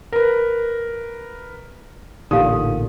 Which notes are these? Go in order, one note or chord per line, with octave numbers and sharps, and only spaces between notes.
A#4 B4
A1 A#2 D3 D#4 G4 F5 D#6